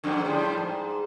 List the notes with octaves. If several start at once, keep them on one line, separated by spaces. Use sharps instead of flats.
F2 G#2 D3
A2 F3 G3
G#2